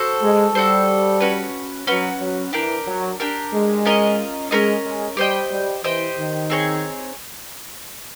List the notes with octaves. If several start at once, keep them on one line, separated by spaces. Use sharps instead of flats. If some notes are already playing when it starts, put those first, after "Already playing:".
Already playing: F#4 A4 C5
G#3
G3 F#4 A4 C5
C#4 F#4 B4
F#3 C#4 F#4 B4
F#3
E3 D4 G4 A#4
F#3
D4 G4 A#4
G#3
C#4 F4 A#4 D#5
G#3 C#4 F4 A#4 D#5
G#3
G3 G4 C5 D#5 G5
G3
E3 G4 C5 D#5 G5
D#3
C4 D#4 G#4 C#5